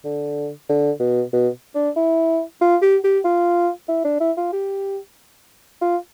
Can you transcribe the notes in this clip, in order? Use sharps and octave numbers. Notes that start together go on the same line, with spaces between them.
D3
D3
B2
B2
D4
E4
F4
G4
G4
F4
E4
D4
E4
F4
G4
F4